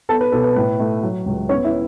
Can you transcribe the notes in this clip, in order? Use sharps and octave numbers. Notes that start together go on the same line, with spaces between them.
B3 A4 A5
B4
B2 A4
B4
A2 B4
A3
F#3
C#2
B3 C#4 C#5
E4 E5